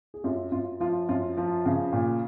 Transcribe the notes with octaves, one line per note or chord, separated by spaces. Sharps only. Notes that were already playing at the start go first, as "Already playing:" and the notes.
G#4
F#2 F4 G4
F#2 F4
F3 F4
F#2 F4
F3
C#3
A#2